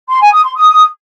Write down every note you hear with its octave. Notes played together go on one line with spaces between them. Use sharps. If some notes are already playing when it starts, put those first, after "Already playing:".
C6
G#5
D#6
C6
D#6